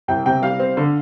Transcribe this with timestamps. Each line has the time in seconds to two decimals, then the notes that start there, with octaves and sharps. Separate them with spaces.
0.08 C2 G5
0.26 C3 G5
0.42 G3 F5
0.60 C4
0.77 D3